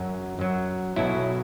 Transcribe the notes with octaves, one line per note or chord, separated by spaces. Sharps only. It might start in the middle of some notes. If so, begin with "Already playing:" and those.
Already playing: F#2 F#3
F#2 F#3
B1 B2 F#3 E4